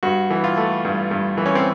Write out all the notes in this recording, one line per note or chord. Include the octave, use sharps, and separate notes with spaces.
G2 F#4
E3
F4
A3
G2
G2
E3
C#4
C4